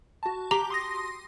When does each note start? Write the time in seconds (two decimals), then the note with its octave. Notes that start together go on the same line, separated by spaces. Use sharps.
0.23 F#4 A5
0.51 G4 A#5 D6 G7
0.70 C6 D#6 A#6